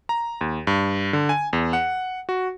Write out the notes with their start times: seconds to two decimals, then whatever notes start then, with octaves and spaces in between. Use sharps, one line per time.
0.09 A#5
0.41 D#2
0.67 G2
1.13 D3
1.29 G#5
1.53 E2
1.73 F#5
2.29 F#4